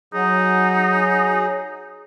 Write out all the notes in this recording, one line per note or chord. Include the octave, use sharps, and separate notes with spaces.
F#3 D#4 G#4